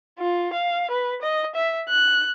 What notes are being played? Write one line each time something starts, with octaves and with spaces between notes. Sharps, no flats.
F4
F5
B4
D#5
E5
F#6